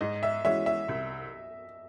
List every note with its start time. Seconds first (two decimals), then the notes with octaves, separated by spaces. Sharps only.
0.01 G#2 D#5
0.23 E5
0.44 E3 G#3 C#4 F#4 E5
0.66 E5
0.88 C2